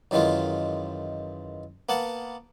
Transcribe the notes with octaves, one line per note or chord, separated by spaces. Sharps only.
F#2 D#3 E3 G#3 F4
A#3 B3 F#5 A5